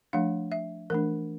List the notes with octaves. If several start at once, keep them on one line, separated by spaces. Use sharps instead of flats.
F3 A3 D4 F5
E5
E3 A3 D4 A#4